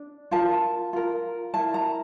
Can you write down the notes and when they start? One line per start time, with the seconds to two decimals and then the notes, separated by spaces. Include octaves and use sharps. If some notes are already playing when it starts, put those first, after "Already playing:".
Already playing: D4
0.31 F4 A#4 A5
0.93 F4 A#4
1.54 E4 A#4 A5
1.74 A#5